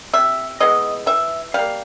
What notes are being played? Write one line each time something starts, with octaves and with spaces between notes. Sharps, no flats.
C3 E5
E3 G#3 B3 D#5
E3 E5
G3 A#3 F5